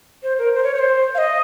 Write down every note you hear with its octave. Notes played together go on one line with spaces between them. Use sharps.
C5
A#4
C5
C#5
C#5
C5
F5
D#5